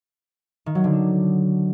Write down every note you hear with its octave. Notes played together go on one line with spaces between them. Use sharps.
D#3
F#3
D3
D4